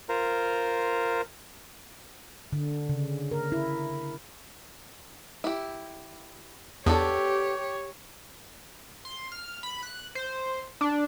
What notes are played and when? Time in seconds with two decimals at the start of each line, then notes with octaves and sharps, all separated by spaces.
0.09 F4 A#4 C5
2.53 D3
2.89 C#3
3.31 A#4
3.52 E4
5.44 E4 G4
6.86 E2 B3 D4 G4 A4 C#5
9.05 C6
9.32 F6
9.63 B5
9.83 F#6
10.15 C5
10.81 D4